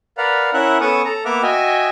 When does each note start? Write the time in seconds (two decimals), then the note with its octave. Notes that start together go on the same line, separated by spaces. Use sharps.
0.18 A#4 B4 D5 F5 F#5
0.54 C#4 E4 A#4 E5 F#5 F#6
0.81 B3 C#4 A4 A5 C#6 D#6
1.05 A4 A#5
1.25 A#3 B3 E5 F#5 D6 F6
1.43 F#4 D#5 E5 G5 G#5